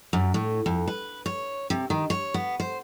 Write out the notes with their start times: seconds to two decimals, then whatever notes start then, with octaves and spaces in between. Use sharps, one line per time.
0.13 F#2
0.34 A2
0.66 F2
0.88 B4
1.26 C#5
1.70 C3
1.90 D#3
2.10 C#5
2.34 B3
2.60 C5